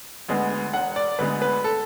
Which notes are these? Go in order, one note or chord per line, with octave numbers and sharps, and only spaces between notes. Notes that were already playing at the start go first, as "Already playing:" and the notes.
D2 D3 G#3 B3
E1 F#5
D5
D2 D3 G#3 B3 B4
B4
A4